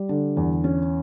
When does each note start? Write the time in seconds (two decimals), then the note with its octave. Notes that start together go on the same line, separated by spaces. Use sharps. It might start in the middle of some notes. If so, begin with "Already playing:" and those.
Already playing: G3
0.09 D3
0.37 E2
0.64 C#4